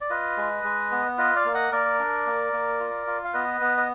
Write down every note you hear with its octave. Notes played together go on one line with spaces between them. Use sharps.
D5
F4 B4 D#5
G#3
G#3
B3
F4 B4 D#5
D5 F5
A#3
D#5 F#5
A#3 A#4 D5
D4
A#3
A#3
F4
F4
F5
B3 B4 D#5
B3
D#5